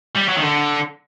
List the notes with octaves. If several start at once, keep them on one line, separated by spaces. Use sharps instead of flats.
G3
F#3
D#3
D3